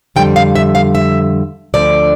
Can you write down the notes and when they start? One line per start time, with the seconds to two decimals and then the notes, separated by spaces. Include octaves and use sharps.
0.16 F2 D3 G3 G5
0.36 F5
0.55 E5
0.75 F5
0.95 E5
1.74 D2 D3 F3 D5